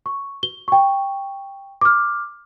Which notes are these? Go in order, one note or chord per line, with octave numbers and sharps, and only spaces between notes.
C#6
G7
G5 C#6
D6 F6